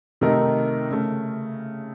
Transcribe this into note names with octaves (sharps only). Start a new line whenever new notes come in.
C3 D#3 A3 D#4 A#4
C#3 A3